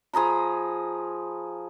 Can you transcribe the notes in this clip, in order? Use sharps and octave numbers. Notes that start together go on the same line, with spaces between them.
F3 G#4 A#5 B5